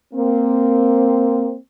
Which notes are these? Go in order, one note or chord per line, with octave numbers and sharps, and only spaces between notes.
A#3 C4